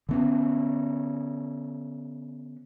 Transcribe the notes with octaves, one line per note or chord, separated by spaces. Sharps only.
D3 B3 C#4